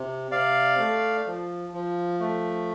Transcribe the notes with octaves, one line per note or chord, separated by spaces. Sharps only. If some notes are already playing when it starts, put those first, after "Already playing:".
Already playing: C3
C3 D5 F5
A3
F3
F3
A3